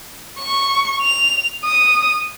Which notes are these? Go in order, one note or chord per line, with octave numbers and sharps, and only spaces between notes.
C#6
F7
D#6